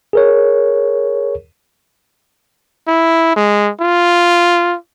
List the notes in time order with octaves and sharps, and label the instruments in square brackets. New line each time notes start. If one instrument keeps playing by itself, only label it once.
[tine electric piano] G#4 A#4 C#5
[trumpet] E4
G#3
F4